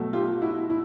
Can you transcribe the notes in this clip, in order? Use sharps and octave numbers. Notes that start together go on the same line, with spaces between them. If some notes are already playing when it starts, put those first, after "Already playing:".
Already playing: B2 F#3 A3
F4 G4
E4 F#4
E4